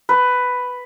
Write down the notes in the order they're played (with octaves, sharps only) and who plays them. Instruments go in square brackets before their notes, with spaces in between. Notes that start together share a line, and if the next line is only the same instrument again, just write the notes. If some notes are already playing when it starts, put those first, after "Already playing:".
[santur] B4